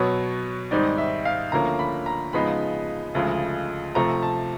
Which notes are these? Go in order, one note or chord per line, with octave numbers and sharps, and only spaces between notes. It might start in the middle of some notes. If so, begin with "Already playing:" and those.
Already playing: B2 F#3 B3 C#5
G#2 D#3 G3 C4 D#4 D5
E5
F5
D2 D3 F3 A#3 C#4 A#5
B5
A#5
C#3 F3 G#3 B3 D#4 B5
D2 C#3 F3 G#3
C3 F3 A3 A#5
A5